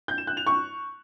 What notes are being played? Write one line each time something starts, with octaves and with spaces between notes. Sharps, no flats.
G6
E7
F#6
F7
C#6